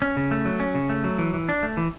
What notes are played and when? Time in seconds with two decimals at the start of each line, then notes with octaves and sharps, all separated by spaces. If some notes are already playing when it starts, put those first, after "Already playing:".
0.02 C#4
0.17 C#3
0.31 A3
0.45 F#3
0.60 C#4
0.75 C#3
0.89 A3
1.04 F#3
1.18 E3
1.34 E3
1.49 D4
1.63 A3
1.77 E3